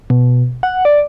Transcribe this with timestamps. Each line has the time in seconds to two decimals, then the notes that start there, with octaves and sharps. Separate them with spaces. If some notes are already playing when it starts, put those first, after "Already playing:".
0.10 B2
0.63 F#5
0.85 D5